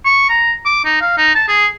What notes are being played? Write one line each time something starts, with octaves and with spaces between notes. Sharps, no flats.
C#6
A#5
D6
D#4
F5
D#4
A5
G#4